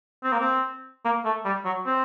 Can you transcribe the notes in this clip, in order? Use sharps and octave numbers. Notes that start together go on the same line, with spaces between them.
C4
A#3
C4
A#3
A3
G3
F#3
C4